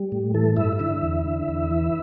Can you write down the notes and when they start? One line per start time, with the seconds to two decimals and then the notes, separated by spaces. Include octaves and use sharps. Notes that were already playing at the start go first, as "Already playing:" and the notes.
Already playing: G3
0.12 A2
0.34 E3 A4
0.57 G2 E4 E5
0.79 D3 E4 E5
1.03 E2
1.26 D3
1.48 E2
1.71 E3